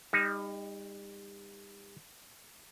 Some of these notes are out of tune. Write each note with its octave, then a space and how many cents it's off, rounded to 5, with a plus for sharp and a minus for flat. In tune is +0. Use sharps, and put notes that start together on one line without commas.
G3 +35 D#4 +0